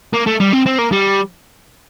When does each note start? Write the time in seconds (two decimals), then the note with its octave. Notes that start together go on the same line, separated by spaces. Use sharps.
0.13 A#3
0.26 A3
0.40 G3
0.52 C4
0.66 C4
0.78 A#3
0.92 G3